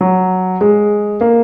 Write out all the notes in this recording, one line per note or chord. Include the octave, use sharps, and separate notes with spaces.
F#3
G#3
A#3